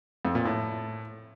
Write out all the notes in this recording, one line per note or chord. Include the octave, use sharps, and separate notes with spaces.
F2
A#2
A2